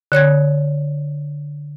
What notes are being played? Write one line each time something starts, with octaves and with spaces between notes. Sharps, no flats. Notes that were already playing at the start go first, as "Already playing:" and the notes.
D3 C#5 F#6 G#6